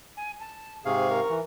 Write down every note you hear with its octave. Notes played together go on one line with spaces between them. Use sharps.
G#5
A5
G#2 C3 G#4 F5 C#6
A#4
E3